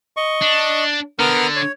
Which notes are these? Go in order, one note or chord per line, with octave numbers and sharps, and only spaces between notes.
D#5 C#6
D4
D3 B3 A#4 F6
C#5